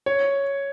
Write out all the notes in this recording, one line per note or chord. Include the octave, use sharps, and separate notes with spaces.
C#5